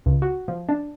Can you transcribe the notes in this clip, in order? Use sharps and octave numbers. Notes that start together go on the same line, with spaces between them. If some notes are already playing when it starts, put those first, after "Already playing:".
C#2
F#4
F3
D4